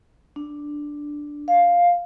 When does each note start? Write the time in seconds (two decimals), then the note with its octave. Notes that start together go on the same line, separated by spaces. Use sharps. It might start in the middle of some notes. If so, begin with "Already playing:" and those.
0.36 D4
1.48 F5